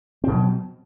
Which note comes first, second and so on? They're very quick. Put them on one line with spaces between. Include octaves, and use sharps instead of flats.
C4 B2 F#3